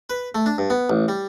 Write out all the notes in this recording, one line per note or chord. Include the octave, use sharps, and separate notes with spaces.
B4
A3
D4
G2
B3
A1
G3